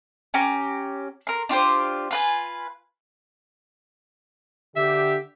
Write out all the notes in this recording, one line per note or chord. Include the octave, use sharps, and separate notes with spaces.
C#4 G4 A#5
A#4 C6
D4 F4 G4 C5
F4 B4 G#5
D3 G4 E5